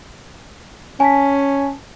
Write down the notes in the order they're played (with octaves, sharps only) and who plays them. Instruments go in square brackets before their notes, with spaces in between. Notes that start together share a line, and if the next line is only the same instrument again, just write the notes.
[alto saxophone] C#4 [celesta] G#5 A5 B6